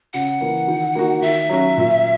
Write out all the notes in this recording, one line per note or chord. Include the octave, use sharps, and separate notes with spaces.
C#3 F#5
E3 A#3
D#3
A#3 D#4 F#4
D#3 E5
F#3 C#4 F#4
A#2